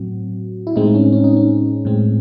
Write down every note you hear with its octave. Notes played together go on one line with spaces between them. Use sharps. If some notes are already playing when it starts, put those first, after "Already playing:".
Already playing: A2 F#3 C4 F#4
E4
A2 G#3 C4 D#4
C#4
C#4
D#4
C#4
A2 G#3 C4